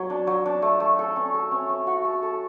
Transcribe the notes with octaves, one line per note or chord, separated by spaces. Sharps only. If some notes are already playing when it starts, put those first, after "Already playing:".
Already playing: F#3
D4
F#3
D4
A3
A3
A4
C#4
A4
C#4
C#4
F#4
A4
A4